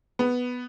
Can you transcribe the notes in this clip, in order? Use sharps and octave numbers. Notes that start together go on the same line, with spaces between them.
B3